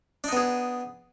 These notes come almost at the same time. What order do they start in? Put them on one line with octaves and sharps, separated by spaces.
D4 D#4 B3 G#4